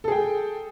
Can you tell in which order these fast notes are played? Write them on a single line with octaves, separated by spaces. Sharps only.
A4 G#4 G5